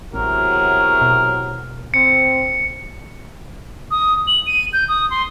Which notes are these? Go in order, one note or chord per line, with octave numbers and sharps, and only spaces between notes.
A1 E2 C3 F#3 A#4
B2
C4 C#7
D#6
F#7
D#7
G6
D#6
C6